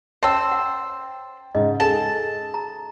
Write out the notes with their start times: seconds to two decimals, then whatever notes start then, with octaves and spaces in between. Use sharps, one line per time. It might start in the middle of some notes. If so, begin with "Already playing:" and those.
0.23 C5 C#5 E5 G5 A5 E6
0.51 F#5
1.55 G#2 C#3 D#5
1.80 G#4 A4 A5
2.54 A#5